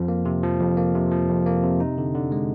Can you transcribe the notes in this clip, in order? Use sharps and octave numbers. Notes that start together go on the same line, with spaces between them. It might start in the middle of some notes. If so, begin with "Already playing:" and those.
Already playing: F2 F3
A#3
C3
F3
F2
A#3
C3
F3
F2
A#3
C3
D#4
D3
D3
G#3